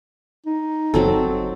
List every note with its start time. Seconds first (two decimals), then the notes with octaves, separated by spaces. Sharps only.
0.46 D#4
0.94 G1 F#3 C4 A4